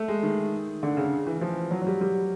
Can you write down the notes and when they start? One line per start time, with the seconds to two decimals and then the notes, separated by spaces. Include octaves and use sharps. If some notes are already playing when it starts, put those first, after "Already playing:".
Already playing: A3
0.08 G#3
0.23 D#3
0.83 D3
0.97 C#3
1.27 E3
1.41 F3
1.71 F#3
1.82 F#3
1.87 G3
2.01 G3